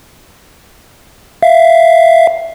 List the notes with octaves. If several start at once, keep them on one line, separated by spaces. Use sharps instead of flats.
E5 F5